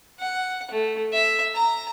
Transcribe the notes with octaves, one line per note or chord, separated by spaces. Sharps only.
F#5
A3
E5
A#5